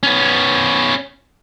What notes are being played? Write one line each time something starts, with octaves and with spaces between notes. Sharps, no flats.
B3 C#4